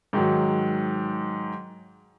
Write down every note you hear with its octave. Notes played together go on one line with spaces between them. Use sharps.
G#2 D#3 F#3